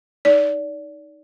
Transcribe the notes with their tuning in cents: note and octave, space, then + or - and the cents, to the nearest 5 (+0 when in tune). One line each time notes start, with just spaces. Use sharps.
D#4 +0 D5 -25